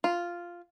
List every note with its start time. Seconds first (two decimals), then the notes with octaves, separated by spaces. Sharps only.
0.04 F4